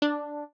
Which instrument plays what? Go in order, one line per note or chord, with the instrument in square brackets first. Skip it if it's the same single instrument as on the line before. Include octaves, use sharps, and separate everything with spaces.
[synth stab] D4